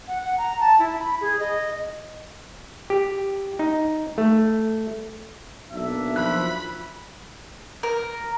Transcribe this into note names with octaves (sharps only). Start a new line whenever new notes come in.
F#5
F#5
A#5
A5
E4
B5
G#4
D#5
G4
D#4
A3
B1 A#3 D4 E5
F3 B5 F#6
A#4